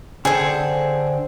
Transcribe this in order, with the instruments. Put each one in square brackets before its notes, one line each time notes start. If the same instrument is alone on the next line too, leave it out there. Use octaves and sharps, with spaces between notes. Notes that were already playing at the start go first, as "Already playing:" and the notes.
[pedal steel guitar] D3 C5 G5 [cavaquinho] G#4 A4